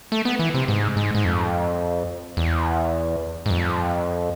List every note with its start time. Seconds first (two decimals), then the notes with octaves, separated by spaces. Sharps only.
0.12 A3
0.25 B3
0.39 E3
0.54 C3
0.68 G#2
0.97 G#2
1.15 G#2
1.25 F2
2.37 E2
3.46 G#2
3.51 F2